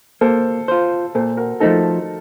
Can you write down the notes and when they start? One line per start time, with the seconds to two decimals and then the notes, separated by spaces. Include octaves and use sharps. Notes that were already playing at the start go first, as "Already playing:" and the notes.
0.21 A#3 A4 C5
0.68 F4 C5
1.15 A#2 A4 C5
1.37 F#4 A#4
1.60 F3 A3 D#4 A4 C5